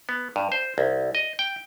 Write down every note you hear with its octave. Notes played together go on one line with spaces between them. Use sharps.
B3
G2
C5
C2
D#5
G5